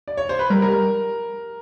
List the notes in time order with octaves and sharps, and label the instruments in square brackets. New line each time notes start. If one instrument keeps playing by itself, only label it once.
[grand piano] D5
C#5
C5
B4
[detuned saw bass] G3 [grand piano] A#4
[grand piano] A#4